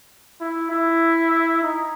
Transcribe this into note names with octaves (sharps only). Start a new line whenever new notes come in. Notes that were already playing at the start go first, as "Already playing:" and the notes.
E4
E4
D#4